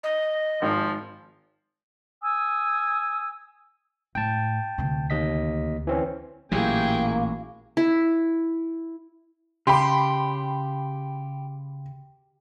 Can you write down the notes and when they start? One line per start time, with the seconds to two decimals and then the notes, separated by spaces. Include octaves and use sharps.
0.04 D#5
0.62 G#1 F3
2.21 G#5 D#6 E6
4.15 A2 G5 A5
4.78 D2 C3
5.10 D#2 D#5 B6
5.87 E3 C4 C#4
6.52 A1 A#2 F#3 A#3 E4 G4 G#4 G5
7.77 E4
9.67 C#3 G4 B5 C6